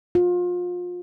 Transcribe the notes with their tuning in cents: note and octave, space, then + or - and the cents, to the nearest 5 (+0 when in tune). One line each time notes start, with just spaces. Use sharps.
F4 +30